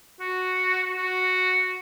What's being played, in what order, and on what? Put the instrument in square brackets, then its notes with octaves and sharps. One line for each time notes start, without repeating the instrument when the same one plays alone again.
[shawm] F#4
F#4